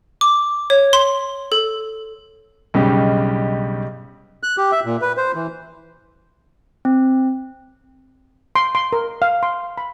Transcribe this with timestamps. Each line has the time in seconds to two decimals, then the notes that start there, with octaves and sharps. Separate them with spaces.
0.21 D6
0.70 C#5
0.93 C6
1.52 A4
2.74 B1 G2 C#3 D#4 G4
4.43 F#6
4.58 G4
4.72 E5
4.85 A#2
5.02 B4
5.17 C5
5.35 E3
6.85 C4
8.56 C6
8.75 C6
8.93 A#4
9.22 F5
9.43 C6
9.78 B5